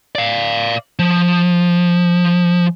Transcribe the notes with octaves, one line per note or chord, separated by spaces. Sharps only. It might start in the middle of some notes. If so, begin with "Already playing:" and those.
D5 F5
F3